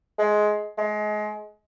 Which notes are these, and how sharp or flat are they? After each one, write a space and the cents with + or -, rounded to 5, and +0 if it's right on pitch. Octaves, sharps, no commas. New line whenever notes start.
G#3 +15
G#3 +30